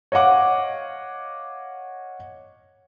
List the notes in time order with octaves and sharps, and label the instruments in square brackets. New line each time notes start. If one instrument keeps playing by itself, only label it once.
[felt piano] C#5 D#5 F5 F#5 D6